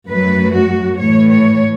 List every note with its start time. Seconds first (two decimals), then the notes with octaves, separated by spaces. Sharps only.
0.09 F#2 F#3 A3 B4
0.55 F#4
1.00 A2 E3 A3 C#5
1.30 C#5